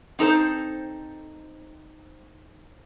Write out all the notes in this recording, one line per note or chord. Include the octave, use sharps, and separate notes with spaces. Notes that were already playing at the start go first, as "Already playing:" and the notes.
C4 D#4 A4 C5